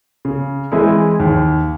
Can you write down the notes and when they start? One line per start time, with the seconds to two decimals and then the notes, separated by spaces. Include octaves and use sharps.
0.25 C#3
0.72 E3 G#3 C4 E4
1.20 D#2